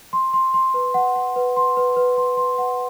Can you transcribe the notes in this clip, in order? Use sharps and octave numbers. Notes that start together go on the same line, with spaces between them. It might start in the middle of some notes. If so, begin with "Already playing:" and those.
C6
C6
C6
B4
F#5
F#5
B4
C6
B4
B4
C6
C6
F#5